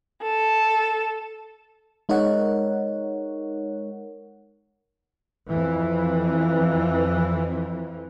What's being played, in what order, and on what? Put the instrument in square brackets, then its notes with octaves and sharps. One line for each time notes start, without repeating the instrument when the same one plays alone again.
[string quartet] A4
[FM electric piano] G#3 D#4 A#4 C#5 F#5
[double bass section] F2 E3